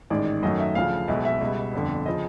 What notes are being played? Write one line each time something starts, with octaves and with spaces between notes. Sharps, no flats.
A1 G#2 D#3 D5
F#2 D#3 F#3 A3 D#5
E5
D2 C#3 F3 F5
B1 B2 G#3 E5
E5
C#2 B2 G3
G1 F2 D3
C#3 F3 D#5